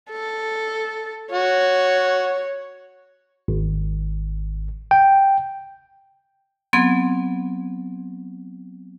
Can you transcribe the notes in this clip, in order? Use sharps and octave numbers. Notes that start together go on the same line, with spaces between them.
A4
F#4 C#5
G#1
G5
F#3 B3 C4 C6 G#6